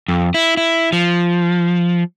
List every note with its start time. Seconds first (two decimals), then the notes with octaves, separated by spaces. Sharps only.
0.08 F2
0.34 E4
0.57 E4
0.93 F3